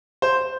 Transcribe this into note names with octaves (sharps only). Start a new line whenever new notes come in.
C5